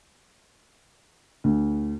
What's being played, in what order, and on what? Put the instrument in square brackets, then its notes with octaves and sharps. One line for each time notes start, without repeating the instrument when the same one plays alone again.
[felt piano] D2